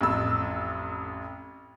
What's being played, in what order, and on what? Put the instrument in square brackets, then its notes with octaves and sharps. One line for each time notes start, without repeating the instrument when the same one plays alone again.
[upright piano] A1 F2 E6